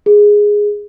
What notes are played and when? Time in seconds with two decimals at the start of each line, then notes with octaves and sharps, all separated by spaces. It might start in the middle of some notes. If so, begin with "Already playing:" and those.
0.06 G#4